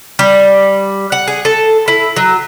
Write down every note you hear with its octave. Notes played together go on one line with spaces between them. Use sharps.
G3
F#5
G#4
A4
E4
F#3